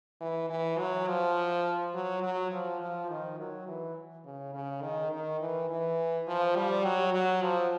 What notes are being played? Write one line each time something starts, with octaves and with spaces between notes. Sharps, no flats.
E3
E3
F#3
F3
F#3
F#3
F3
F3
D#3
F#3
E3
C#3
C#3
D#3
D#3
E3
E3
F3
G3
F#3
F#3
F3